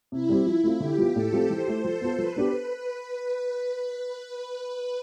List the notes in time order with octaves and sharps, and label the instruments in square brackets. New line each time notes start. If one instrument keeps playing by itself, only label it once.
[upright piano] C3 [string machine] E4
[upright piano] G3 C4 G4
F3
A3 C4 F4
[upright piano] D3 [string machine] G4
[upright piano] F3 B3 F4
[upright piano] A2 [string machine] A4
[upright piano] F3 A3 C4 F4
[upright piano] E3 [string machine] C5
[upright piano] A3 E4 G4
[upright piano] F3 [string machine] A4
[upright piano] B3 F4
[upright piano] F3 [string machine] B4
[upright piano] B3 D4 G4